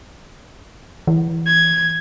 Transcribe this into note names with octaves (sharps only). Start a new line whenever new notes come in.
E3
G#6